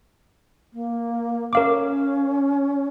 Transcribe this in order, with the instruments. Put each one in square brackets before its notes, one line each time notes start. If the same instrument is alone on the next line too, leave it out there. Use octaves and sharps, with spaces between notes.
[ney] A#3
[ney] C#4 [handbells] A#4 F5 D6